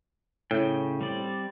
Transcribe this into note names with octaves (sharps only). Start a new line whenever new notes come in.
A2 C#3 G5
G3 C4 D5